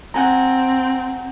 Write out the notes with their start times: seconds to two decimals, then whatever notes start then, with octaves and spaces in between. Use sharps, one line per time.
0.14 C4 F#5 G#5 A#5